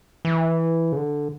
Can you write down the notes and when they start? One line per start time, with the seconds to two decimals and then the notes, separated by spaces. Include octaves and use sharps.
0.25 E3
0.92 C#3
0.96 D3